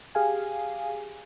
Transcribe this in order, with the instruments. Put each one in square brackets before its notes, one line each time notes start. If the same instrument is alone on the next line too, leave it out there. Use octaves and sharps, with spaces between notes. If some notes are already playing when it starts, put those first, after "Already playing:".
[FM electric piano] G4 G#4 F5 G#5